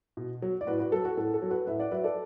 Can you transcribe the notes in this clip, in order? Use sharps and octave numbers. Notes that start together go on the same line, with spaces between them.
B2
F#3
D5
A2 F#4 B4
F#4 B4
F#3 A4
F#4
A2 A4
A4
F#3
F#4 B4
A2 B4 E5
D5 F#5
F#3 B4 E5
A4 D5